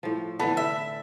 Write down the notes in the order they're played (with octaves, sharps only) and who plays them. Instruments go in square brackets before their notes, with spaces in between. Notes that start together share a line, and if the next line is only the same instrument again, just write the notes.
[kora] A2 F3
[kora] D3 E3 [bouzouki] B3 [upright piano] A5
[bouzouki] E5